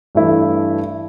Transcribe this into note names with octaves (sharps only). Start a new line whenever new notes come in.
G2 E3 A3 E4